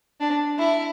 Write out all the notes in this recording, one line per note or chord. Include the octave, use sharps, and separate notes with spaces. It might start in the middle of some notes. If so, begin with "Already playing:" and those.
D4
E4